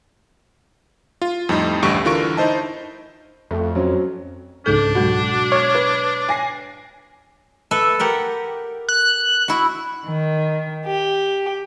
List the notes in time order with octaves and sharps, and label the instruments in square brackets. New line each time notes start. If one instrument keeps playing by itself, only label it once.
[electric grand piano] F4
F2 A2 G3 C4 D#4
A1 D2 G2 G4 C#6 D7
D3 E3 F4 A#4 C#6 D7
D#4 E4 C5 D#5 A5
[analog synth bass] F2 [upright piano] A3
[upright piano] F#3 C4 C#4
[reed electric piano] C#2 G#2 G6 [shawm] D4 [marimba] A4
[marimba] B2 F#3 G#3 [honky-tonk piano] F#4
[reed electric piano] C#5 [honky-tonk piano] F6 G#6
[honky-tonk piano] B4
G#5 A#6 C7
[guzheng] A4 B4 E5
G4 A#4 F#5
[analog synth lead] F#6
[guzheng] E4 F#4
[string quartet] D#3
G4